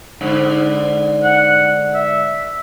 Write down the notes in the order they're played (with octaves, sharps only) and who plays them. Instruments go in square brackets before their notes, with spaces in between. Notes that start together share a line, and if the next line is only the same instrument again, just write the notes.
[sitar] G#2 D3
[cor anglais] F#5
E5